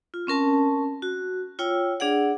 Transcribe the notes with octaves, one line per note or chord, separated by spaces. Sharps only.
F4
C4 C#4 A#4 A5
F#4
F4 C#5 G5 E6
D4 G#4 D5 F#5